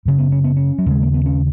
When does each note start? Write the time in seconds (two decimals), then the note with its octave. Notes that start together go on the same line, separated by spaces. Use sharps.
0.05 F#2 C#3
0.19 B3
0.32 C#4
0.44 B3
0.57 C#4
0.78 F#3
0.86 D#2 C#3 G#3
1.03 A#3
1.14 B3
1.26 C#4